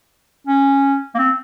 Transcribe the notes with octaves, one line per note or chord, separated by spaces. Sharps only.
C#4
A#3
C4